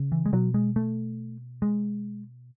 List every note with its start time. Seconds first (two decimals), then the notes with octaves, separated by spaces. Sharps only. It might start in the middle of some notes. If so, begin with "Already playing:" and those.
Already playing: C#3
0.12 E3
0.26 G#3
0.33 B2 F#3
0.54 G#3
0.76 A3
1.62 G#3